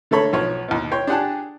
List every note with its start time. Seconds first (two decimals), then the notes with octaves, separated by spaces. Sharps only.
0.11 D3 A3 A#3 A4 C#5 B5
0.33 B1 F3 C#5
0.68 D#2 B2
0.92 C#5 G5 C6
1.07 D4 G4 G#4 F#5 G5 A5